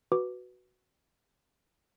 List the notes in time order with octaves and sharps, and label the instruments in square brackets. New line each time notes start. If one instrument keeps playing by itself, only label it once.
[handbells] F#4 B4 D6